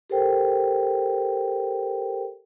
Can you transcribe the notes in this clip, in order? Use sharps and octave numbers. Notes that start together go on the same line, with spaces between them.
G4 A4 A#4 C5 G5